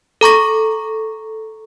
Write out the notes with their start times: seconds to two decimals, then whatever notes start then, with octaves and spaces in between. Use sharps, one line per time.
0.21 A4 A#5 C#6 A#6